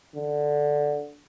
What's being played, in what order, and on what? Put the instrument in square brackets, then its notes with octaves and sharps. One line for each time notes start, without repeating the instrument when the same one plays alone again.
[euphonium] D3